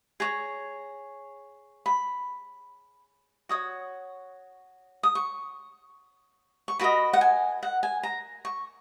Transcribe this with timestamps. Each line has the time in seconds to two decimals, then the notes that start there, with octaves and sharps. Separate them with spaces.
0.20 G#4 C#5 A#5
1.86 B5
3.49 F#4 C#5 D#6
5.03 D#6
5.15 C#6
6.68 C#6
6.79 F#4 A#4 D#5 B5
7.13 F#5
7.21 G#5
7.63 F#5
7.83 G#5
8.03 A#5
8.45 C#6